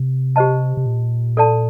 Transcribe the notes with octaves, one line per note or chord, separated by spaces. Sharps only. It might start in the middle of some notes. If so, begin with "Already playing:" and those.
Already playing: C3
G4 C5 D#5 A5
C3
A#2
A4 D5 A5